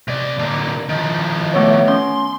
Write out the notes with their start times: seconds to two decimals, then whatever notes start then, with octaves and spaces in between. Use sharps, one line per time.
0.08 C3 D5
0.39 D3 A#3
0.89 D#3 F3
1.54 A3 B3 C#5
1.88 C#4 C6